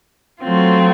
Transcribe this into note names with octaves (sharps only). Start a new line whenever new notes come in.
F#3 A3 C4 F4